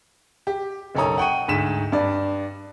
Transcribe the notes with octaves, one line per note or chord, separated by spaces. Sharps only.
G4
F#1 B1 A4 C#5 A#5 D#6
F#5 G5 C#6 D#7
D2 G#2 B6 E7
G2 D5